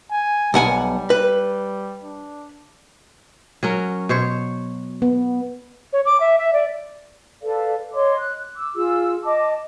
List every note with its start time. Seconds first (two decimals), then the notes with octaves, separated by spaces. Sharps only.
0.11 G#5
0.54 B1 G3 F#5 G#5
1.10 B4
2.04 D4
3.63 F#3 C#4 A#4
4.09 B2 C5 C#5
5.02 B3
5.93 C#5
6.06 D6
6.20 E5
6.38 E5
6.53 D5
7.42 A4 B4 D5 F5
7.93 C#5 D#5 C6 D6
8.16 F#6
8.55 D6 E6
8.74 F4 G#4 E6
9.24 D#5 A5 D6